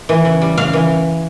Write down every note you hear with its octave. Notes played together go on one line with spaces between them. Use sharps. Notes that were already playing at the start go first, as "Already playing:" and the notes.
E3
C#3
G3
C#3 F5
E3